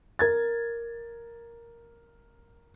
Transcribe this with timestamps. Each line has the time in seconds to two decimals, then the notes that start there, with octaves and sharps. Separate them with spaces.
0.19 A#4 G#6 A6